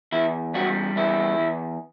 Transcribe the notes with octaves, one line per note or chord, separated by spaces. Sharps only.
E2 E4
G3 F#4
E2 E4
E2